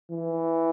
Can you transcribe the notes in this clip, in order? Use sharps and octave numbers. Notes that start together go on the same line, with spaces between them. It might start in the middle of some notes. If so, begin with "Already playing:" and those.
E3